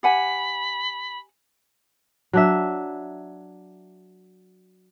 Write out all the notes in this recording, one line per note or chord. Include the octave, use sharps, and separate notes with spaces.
G4 F#5 G#5 B5
F#3 D4 E5